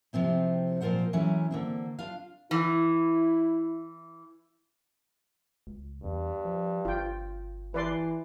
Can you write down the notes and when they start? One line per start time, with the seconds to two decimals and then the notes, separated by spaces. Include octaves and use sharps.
0.13 C3 F3 C4 E4
0.81 A#2 F3 F4 A#4 C5 F#5
1.13 E3 F#3 A3 C#4
1.51 D3 A#3 C4
1.99 D4 F4 F5
2.51 E3 E4
5.67 C#2
6.04 E2 G2
6.45 F3
6.85 G1 F4 G5
7.74 E3 B4 D5 C6